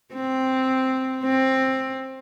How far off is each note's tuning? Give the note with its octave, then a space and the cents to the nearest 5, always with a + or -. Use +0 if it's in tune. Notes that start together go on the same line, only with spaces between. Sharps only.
C4 +0
C4 +15